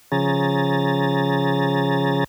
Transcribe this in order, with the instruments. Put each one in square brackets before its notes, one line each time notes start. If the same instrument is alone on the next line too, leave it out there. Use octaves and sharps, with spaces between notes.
[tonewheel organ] C#3 F3 C#4 G#4 A#5 A6